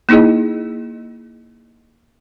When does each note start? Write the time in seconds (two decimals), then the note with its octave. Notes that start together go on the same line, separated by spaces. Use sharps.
0.09 A#3 D#4 E4 G#4 D#5